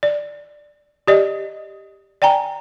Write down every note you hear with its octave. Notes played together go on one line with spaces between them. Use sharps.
D5
G4 D5 D#5
D5 G5 G#5 A#5